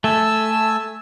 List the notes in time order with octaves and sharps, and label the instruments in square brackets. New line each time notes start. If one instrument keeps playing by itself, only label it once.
[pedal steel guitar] A3 [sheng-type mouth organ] G#5 A5 E6